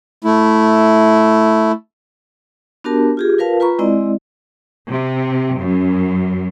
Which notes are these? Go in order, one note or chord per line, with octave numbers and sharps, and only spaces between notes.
A3 E4
B3 D4 F#4 G4 A#4 A5
F4 G4 G#4
F4 A#4 B4 F5 A5
F4 B4 A#5 B5 C#6
G#3 C4 E4 D5 D#5
C3
F#2